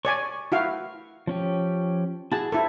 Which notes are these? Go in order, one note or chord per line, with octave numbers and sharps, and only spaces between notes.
C#5 D5 G#5 C#6
E4 F#4 F5
F3 C#4 G4
E4 F#4 G#4 A5
E4 G4 A4 C5 G#5